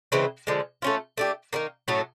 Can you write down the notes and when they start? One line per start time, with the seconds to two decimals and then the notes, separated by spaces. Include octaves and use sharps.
0.12 C#3 E3 G#3 C4
0.47 D3 F3 G#3
0.82 A3 C#4 F4
1.17 A3 D4 G4
1.53 D#3 F#3 A#3
1.88 A2 F#3 A3 C#4